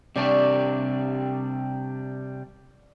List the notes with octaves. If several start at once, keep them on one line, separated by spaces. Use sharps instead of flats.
C3 G3 D4 D5 C#6